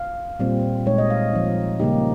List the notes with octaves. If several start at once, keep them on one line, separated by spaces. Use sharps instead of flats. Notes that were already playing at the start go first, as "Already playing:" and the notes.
Already playing: F5
A#2 G3 C4
A#2 G#3 D#4 C#5
D#5
F5
F3 C4 D#4
C#3 G3 A#3 D#4 G4